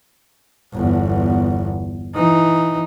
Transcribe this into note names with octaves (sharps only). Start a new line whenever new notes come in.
G1 E2
E3 D#4